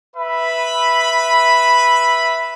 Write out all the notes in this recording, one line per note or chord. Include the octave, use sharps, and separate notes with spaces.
B4 E5 B5